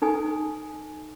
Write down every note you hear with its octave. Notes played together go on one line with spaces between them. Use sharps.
D#4 A4 G#5